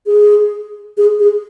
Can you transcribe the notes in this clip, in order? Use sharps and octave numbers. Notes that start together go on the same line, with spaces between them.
G#4
G#4
G#4